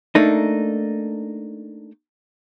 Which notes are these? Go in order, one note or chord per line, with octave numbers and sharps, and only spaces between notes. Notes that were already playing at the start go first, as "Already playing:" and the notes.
A3 A#3 D4 D#4